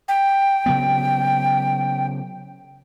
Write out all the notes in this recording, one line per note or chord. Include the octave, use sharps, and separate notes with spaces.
G5
C#3 F#3 B3